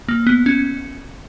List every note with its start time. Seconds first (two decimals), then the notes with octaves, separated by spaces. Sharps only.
0.09 A#3
0.27 B3
0.46 C#4